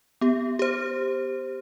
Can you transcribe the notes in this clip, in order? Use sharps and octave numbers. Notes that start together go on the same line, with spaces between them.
B3 G4
G4 C5